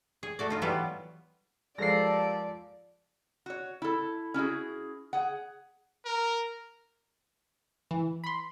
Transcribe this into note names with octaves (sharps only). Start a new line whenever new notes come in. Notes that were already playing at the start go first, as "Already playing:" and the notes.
G#4
A3 F#4 D5
D#4 F4
E3 F#3 G3 B3 F4
F3 G#3 A#3 G4 A4 D5 A#6 C7
F#4 C#5
E4 A4
C#4 E4 F#4 G#4
G#4 F#5
A#4
E3
B5 C6